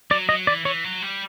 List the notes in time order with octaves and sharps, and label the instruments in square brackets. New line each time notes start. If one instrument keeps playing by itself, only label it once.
[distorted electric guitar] F#3 [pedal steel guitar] D5
[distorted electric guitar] F#3 [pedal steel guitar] D#5
[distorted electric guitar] E3 [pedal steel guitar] D5
[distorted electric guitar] E3 [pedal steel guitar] C#5
[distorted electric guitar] F#3
G3